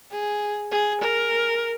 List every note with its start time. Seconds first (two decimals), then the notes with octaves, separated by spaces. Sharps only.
0.11 G#4
0.71 G#4
1.02 A#4